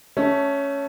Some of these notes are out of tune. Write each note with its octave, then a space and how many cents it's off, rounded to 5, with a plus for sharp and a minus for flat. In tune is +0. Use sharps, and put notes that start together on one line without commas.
A3 +0 C#4 +10